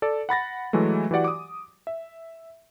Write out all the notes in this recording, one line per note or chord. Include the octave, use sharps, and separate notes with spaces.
A4 D5
F#5 B5 A6 A#6
E3 F#3 G#3 A3
E3 F#4 G4 D5 F#5
D6 D#6
E5